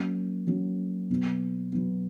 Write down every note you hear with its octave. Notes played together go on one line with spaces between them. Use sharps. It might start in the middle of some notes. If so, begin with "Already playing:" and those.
Already playing: F#3 A#3 C#4
F#3 A#3 C#4
B2 F#3 B3
B2 F#3 B3